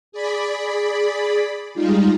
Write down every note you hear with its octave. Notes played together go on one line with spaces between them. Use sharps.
G#4 D5 B5
G3 G#3 D#4 F4